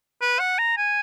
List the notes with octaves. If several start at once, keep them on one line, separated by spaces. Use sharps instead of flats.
B4
F#5
A#5
G#5